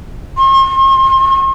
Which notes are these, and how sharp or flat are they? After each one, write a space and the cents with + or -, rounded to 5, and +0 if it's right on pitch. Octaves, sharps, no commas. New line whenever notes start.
C6 +45